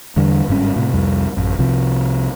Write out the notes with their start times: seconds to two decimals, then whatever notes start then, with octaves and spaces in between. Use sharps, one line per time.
0.16 E2 D3 G3
0.48 G1 G#2 G3 C#4
0.76 A2 C3
0.93 C2 F2 G3
1.37 A1 F#2
1.59 C2 C3 F3